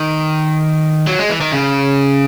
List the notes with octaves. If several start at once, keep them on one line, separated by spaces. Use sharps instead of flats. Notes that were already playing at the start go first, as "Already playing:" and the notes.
Already playing: D#3
F#3
G#3
E3
D#3
C#3